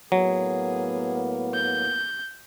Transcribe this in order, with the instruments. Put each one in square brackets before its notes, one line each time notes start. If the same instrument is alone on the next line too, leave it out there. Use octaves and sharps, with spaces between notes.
[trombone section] A2 A#3 B3 [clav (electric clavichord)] F#3 [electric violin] G#4
[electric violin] G6